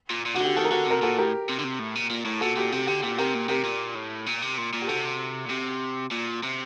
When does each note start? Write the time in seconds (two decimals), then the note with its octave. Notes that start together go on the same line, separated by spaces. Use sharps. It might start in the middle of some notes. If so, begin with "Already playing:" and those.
0.10 A#2
0.25 A#2
0.35 C3 F#4
0.40 D3 G4
0.56 D#3 F#4 A4
0.64 A#4
0.71 D3 F#4 A4
0.86 C3 A#4
1.02 A#2 F#4 A4
1.18 A2 G4 A#4
1.49 C3
1.59 D3
1.64 C3
1.79 A2
1.95 A#2
2.10 A#2
2.25 A2
2.41 A#2 F#4 A4
2.56 A#2 G4
2.72 C3 G4
2.87 D3 G4
3.03 A#2 G4
3.18 C3 G4 A#4
3.34 A#2
3.49 C3 G4 A#4
3.64 A#2
3.95 A2
4.26 A#2
4.42 C3
4.57 A#2
4.73 A#2
4.82 G4
4.88 C3 F#4 A4
5.45 A#2
5.50 C3
6.11 A#2
6.43 C3